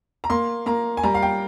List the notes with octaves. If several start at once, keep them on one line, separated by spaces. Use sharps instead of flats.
A#5
A#3 C6
A#3 A#5
G#5
G3 A#5
F5
G5